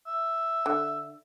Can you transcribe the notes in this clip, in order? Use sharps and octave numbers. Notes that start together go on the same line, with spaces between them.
E5
D3